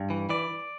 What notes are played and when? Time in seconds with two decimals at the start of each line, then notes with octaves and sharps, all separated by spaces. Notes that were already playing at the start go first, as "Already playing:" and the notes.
Already playing: G2
0.10 E3
0.29 E3 D5